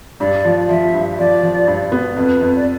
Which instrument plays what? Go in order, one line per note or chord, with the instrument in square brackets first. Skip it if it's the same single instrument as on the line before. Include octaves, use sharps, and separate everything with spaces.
[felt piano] G2 [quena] D5
[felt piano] F3
[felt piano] F3 [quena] E5
[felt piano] G2
[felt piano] F3 [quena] D5
[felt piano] F3
G2
B3
[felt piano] F2 [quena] B4
[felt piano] F2
[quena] D5